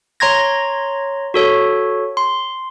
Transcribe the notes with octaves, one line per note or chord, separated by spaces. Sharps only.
C#5 A#5 C6 G#6 A#6
F#4 A4 C#5
C6